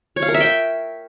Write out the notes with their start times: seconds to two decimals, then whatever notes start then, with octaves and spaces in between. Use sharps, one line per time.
0.16 C#5
0.22 F5
0.28 A#4
0.34 E5
0.41 G5